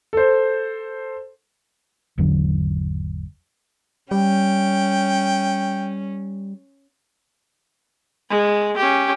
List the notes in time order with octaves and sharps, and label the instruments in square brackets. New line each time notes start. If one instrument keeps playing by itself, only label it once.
[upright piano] A4 C5
[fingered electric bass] G#1 E2 D3 F#3
[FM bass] G3 [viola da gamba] C#4 [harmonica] G5
[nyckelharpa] G#3
C#4 G4